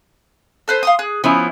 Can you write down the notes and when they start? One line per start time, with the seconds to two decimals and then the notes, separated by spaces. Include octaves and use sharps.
0.68 A4 B4 C5
0.83 F5 C6 D#6
0.99 G#4 F#6
1.24 F3 B3 C#4 E4